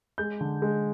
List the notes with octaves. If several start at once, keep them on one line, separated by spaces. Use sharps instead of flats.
G#3 G6
D3
G#3